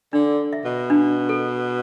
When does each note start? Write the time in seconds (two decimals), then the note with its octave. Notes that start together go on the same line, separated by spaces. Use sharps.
0.13 D3 D4
0.53 E5
0.65 B2
0.90 D4
1.29 A4